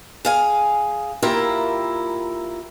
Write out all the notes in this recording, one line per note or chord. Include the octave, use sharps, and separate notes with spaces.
G#4 F5 G#5
A#3 E4 F4 G4 A#4 E5